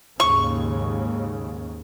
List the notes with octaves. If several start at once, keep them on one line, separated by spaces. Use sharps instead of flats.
D#2 G#2 C#3 C#6